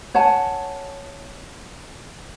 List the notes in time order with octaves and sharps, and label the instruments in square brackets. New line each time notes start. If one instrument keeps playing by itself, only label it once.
[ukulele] C#5 F#5 G#5 A5